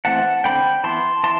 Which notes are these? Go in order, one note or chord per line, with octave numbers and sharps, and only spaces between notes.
E3 A3 C4 F#5 A5
D3 A3 C4 G5 B5
E3 B3 A5 C6
E3 A5 C6